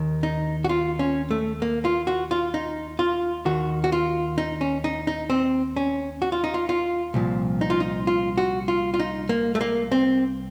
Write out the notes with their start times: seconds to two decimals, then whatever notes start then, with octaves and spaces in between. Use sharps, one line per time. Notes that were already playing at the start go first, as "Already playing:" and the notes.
Already playing: D#2 D#3
0.23 D#4
0.64 F#4
0.69 F4
0.99 C#4
1.31 A3
1.62 A#3
1.85 F4
2.07 F#4
2.31 F4
2.54 D#4
2.99 F4
3.45 D#2 D#3 F#4
3.84 F#4
3.92 F4
4.38 D#4
4.61 C#4
4.84 D#4
5.07 D#4
5.30 C4
5.77 C#4
6.22 F#4
6.32 F4
6.44 D#4
6.54 F4
6.69 F4
7.14 C2 A#2 F3
7.61 D#4
7.70 F4
7.80 D#4
8.07 F4
8.38 F#4
8.68 F4
8.94 F4
8.99 D#4
9.29 A#3
9.55 A3
9.61 A#3
9.92 C4